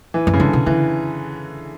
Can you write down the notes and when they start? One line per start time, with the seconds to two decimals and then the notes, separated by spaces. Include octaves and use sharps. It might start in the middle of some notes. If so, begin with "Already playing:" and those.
0.14 E3
0.27 F#2
0.33 C#3
0.40 G2 D3
0.53 B2
0.66 D3 E3